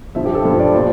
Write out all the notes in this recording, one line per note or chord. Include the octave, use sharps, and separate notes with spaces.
G2 F3 E5
G4
A4
G2 F3
D5
A#2 F3 C5